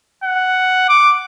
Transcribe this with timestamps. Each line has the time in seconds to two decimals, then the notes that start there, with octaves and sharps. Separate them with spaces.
0.24 F#5
0.89 D6